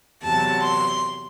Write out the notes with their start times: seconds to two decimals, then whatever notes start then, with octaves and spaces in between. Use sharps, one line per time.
0.24 E2 C3 F#3 A5
0.64 C6